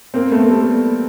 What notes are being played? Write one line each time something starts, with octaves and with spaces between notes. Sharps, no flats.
A#3 C4
A3 B3
G3 A3